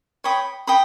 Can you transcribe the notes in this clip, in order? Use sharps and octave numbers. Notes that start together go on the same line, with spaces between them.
C#5 G5 B5 D#6
G5 B5 D#6